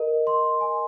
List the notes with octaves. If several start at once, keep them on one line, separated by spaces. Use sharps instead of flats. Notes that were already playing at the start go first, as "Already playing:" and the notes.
Already playing: A#4 D#5
C6
G#5